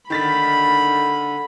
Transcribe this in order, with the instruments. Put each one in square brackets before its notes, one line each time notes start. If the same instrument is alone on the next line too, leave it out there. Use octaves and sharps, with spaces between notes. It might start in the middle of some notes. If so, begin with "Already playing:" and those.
[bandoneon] D3 [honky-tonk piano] D#3 A6 B6 [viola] B5